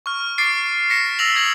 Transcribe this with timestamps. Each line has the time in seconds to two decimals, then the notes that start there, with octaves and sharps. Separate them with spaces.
0.06 C#6 F6
0.38 D6 A6 C7 D7
0.90 A#6 B6 C#7 E7
1.19 E6 A#6 F7 F#7
1.35 D#6 G#6 A#6 B6 F#7